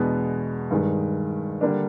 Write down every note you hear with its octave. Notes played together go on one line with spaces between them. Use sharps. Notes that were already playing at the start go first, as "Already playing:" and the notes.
Already playing: E2 B2 G#3 B3 D4
G2 D#3 G#3
D3 G3 A#3 D4